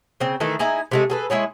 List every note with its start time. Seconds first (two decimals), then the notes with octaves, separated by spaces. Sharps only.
0.20 C#3 C4
0.40 D#3 E3 A3 A4
0.59 D#4 E4 G#4 A#5
0.91 C3 G#3 A3
1.10 G#4 A4 B4
1.30 G#3 E4 G#4 C#5